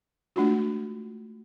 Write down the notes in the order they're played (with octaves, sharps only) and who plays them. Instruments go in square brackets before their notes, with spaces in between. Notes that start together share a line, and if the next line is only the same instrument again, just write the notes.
[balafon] G#3 A3 D4 F4 F#4